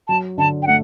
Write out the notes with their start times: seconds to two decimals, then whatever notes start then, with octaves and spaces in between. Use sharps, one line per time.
0.08 F#3 A5
0.38 D3 A5
0.62 G5
0.67 A3 F#5